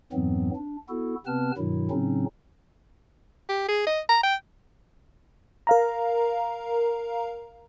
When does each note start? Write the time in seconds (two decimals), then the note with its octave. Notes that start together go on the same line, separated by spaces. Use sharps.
0.13 F2 G#2 E3 F#3 B3 C4
0.55 D4
0.89 B3 E4 F#4 A4
1.26 C3 B3 C4 B4 A5 F6
1.58 G2 B2 D#3 F#3 E4
1.91 A2 C#3 F#3 C4 C#4 D#4
3.49 G4
3.68 G#4
3.87 D#5
4.09 A#5
4.23 G5
5.67 A#4 F5 A#5